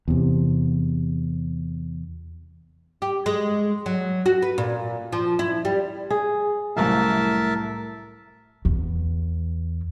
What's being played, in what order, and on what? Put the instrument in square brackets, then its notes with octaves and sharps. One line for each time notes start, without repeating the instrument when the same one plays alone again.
[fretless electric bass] E2 C3
[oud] G4
G#3
F#3
F#4
B4
A#2
F3
E4
G3
[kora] G#4
[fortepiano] C2 F#2 F5 [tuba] A2 [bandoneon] A#4 E5 A5
[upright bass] E2